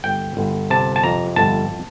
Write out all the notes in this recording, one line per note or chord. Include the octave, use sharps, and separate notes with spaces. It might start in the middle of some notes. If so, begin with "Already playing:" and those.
G1 G5
G1
C3 A5
A5
F2 A#5
G1 A5